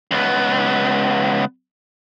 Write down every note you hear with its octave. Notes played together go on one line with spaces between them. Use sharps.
C#2 B3